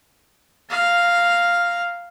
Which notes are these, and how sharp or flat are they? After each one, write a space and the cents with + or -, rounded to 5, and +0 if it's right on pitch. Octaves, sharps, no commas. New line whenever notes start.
F5 +0 A#5 +0